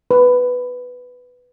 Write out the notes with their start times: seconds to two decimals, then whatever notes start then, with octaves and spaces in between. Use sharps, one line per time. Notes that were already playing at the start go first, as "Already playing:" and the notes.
0.11 B4